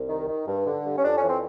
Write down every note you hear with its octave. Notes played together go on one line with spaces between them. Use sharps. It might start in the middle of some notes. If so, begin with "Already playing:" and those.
Already playing: C2
D#3
D#3
G2
D3
G2
C#4
F2 D4
C#4
E3
C4